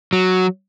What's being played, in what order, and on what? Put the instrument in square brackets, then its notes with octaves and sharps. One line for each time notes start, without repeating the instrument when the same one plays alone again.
[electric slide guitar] F#3